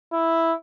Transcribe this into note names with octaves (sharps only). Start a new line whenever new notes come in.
E4